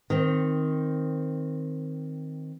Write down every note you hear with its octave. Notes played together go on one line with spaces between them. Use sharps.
D#3 C4